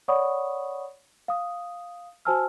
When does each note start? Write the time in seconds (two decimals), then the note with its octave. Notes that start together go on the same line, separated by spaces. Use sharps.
0.08 C#5 D5 F#5 B5 C#6 D#6
1.28 F5 D#6
2.25 F#4 C5 G#5 A5 E6 F6